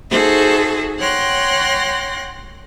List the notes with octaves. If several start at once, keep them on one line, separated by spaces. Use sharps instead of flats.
D#4 F#4 G#4 A4 C5 E5
C#5 F#5 G5 C6 F#6 A#6